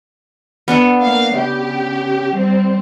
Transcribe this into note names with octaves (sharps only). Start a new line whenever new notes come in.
B3 D4 A4
A#3 F5
C#3 G4
G3 C4